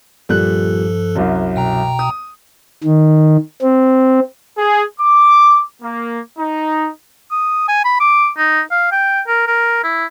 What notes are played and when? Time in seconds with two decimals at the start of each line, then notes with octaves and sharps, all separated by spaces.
0.29 G2 A#2 F3 G3 A4 F#6
1.15 C2 F#2
1.56 B2 G5 A#5
1.99 D#6
2.84 D#3
3.62 C4
4.58 G#4
5.01 D6
5.83 A#3
6.39 D#4
7.31 D#6
7.68 G#5
7.85 B5
8.00 D6
8.38 D#4
8.71 F5
8.92 G5
9.28 A#4
9.47 A#4
9.84 E4